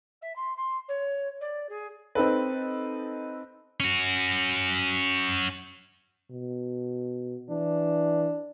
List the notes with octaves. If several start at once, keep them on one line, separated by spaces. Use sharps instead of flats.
E5
C6
C6
C#5
D5
G#4
C4 D#4 A4 B4
C#4 F#4
B2
E3 D4